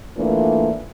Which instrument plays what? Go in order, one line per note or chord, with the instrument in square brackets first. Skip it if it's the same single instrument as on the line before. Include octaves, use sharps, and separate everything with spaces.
[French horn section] E3 A3 A#3 D4 F4